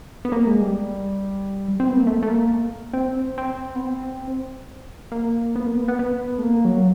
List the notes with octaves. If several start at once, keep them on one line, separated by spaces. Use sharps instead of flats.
B3
A#3
G#3
G3
C4
B3
A#3
A3
A3
A#3
C4
C4
B3
C4
A#3
B3
A#3
B3
B3
B3
A3
A#3
F#3